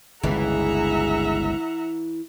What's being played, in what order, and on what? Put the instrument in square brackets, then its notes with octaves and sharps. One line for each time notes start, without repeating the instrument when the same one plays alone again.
[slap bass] G1 C#2 [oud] E3 [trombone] G#4 [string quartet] E5 F#5 A#5